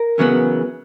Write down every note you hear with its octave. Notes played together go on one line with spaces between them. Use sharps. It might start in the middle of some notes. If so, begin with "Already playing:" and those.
Already playing: A#4
E2 C#3 F#3 B3